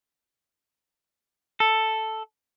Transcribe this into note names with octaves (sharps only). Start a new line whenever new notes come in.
A4